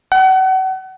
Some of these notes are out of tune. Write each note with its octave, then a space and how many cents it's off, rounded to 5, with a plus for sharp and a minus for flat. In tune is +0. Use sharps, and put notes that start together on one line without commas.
F#5 +35